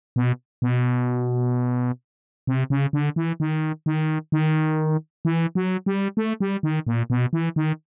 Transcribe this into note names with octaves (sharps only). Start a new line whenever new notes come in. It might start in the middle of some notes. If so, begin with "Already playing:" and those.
B2
B2
C3
C#3
D3
E3
D#3
D#3
D#3
E3
F#3
G3
A3
G3
D#3
A#2
B2
E3
D#3